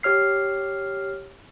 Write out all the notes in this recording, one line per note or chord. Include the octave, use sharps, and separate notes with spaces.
G4 C#5 F6 C7